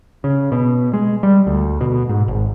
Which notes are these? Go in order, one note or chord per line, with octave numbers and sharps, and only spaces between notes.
C#3
B2
G#3
G3
D2
B2
G#2
G#1